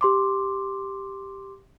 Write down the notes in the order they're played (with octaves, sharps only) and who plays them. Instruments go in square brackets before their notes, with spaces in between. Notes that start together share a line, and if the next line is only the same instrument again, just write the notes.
[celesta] G4 C6 D6